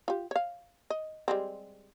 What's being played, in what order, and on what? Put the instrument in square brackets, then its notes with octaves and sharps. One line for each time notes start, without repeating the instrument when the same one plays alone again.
[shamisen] F4 G4
C#5 F5
D#5
G3 G#3 C4